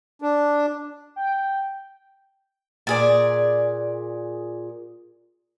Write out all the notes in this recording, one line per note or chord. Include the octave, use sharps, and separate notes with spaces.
D4
G5
A#2 G#4 D5